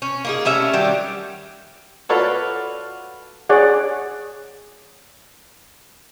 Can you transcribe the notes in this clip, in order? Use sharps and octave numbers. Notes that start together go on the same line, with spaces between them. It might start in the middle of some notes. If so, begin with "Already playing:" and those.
C#4
A#3 D#4 G#4
G3 A3 C#4 E5
D#3 F#3 G3
F4 F#4 A4 B4 C#5 D5
G#4 C#5 D5 F#5